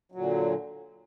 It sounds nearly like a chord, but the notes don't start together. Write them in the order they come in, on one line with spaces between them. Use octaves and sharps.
F#3 A#2 D3